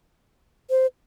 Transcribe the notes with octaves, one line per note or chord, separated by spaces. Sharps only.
C5